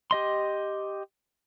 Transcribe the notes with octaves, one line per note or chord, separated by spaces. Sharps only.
G4 D#5 C6